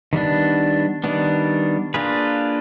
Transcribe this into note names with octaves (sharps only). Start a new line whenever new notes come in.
D#3 G3 B3 D4
D#3 G3 B3 D4
A#3 D4 F4 G#4 B4